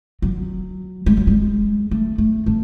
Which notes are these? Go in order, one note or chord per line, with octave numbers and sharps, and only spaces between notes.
F#3
G#3
F#3
G#3
A3
A3
A3